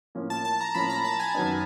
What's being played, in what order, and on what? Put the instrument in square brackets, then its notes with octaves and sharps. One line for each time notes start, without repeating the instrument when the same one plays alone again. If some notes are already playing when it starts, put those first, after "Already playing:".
[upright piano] A2 F3 A#3 C#4
[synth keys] A5
A5
A#5
[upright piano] A2 F3 A#3 C#4 [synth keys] B5
[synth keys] A#5
A5
G#5
[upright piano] F#2 D#3 F#3 B3 D#4